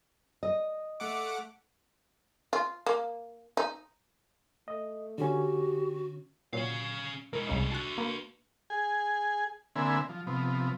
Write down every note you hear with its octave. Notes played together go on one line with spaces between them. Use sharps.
D#5
A3 F#5 D6
F4
A#3
D#4
A3 D#5
D3 C#4 F#4 G4
A#2 F#3 C#4 F5
G#3 E4 A#4
C2 C#3 D#4
D4 F#4 A5 F#6
A#3 B4
G#4 G#5
D3 A#3 C4 E5 G#5 B5
F3
C3 F3 B3